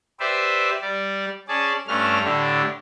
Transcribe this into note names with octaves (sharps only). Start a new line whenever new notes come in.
G4 B4 C5 D5 E5
G3 D5
C#4 G#4 D5 A5
G2 A3 C#4 D4 F6
A2 D3 D4 G4